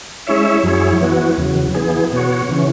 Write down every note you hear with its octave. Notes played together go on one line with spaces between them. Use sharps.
G#3 C#4 E4 C#5 E5
F#2 F#3 E4 G#4 C#5
E3 B3 F#4
E2 C#3 F#3
E3 B3 G#4
B2 B3 F#4 C#5
C#3 E3 C#4